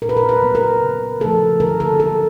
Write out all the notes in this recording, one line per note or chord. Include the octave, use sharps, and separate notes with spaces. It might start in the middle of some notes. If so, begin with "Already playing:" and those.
A#2 A#4
B4
A#4
B4
F#3 B3
A#4
C#3
F3 A3 A4
D3 A#4
A4
F#3 A#3 A4